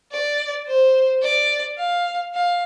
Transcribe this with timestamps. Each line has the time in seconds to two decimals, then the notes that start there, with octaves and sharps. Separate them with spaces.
0.12 D5
0.67 C5
1.22 D5
1.78 F5
2.34 F5